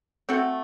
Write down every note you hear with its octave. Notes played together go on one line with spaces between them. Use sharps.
A3 C4 F#4 A4